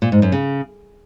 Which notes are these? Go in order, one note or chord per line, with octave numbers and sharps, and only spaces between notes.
A#2
G#2
F#2
C#3